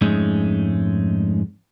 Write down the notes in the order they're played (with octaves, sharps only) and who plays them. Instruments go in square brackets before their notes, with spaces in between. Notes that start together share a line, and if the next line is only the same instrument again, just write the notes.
[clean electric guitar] F2 G#2 G#3 A3 C#4 D#4